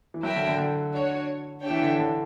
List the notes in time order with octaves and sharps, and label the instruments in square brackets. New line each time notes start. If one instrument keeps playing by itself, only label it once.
[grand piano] E3
[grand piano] F#3 [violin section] E4 A#4 E5 G5
[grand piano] D3
D3
D3
[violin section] D4 F#4 C#5
D4 G4 C#5 E5 G5
[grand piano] E3
D3
D3